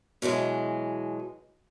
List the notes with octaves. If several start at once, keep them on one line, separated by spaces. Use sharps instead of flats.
B2 E3 F#3 G#3